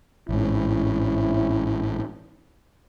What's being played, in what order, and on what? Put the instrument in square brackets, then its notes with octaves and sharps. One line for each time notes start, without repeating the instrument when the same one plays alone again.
[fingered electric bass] A1 G#2 [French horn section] C4 C#4 E4